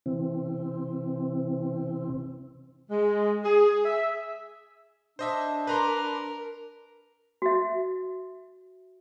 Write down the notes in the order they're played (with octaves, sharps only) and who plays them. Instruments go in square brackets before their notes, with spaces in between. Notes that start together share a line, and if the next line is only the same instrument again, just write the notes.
[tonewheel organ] C3 E3 C4
[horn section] G#3
G#4
E5
[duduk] D4 [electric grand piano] C5 D#5 E5
[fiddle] A#4 [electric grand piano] B4 A#5 C6
[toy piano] F#4 E5